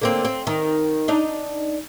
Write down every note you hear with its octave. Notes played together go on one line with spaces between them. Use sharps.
D3 A#3 C4
C4
D#3
D4 D#4